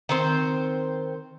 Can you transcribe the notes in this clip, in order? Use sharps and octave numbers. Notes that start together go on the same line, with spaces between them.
D#3 C4 C5